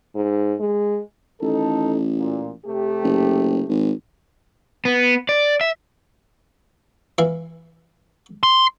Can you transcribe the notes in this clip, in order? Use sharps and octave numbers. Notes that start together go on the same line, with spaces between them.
G#2
G#3
A1 D#3 D#4 A4
A#2
C3 A3 G4
F#1
G#1
B3
D5
E5
E3 E5 F5
C6